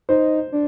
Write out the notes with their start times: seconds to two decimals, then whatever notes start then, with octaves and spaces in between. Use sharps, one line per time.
0.09 D#4 C5
0.52 D4